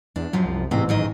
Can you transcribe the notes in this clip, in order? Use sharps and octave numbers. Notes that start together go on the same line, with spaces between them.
E2 D4
F#2 F3 F#3
C2
A1 G#2 C3 C4
F#2 D#3 D#5